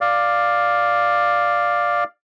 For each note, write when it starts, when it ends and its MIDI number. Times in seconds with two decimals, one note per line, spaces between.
0.01 2.04 74
0.01 2.04 77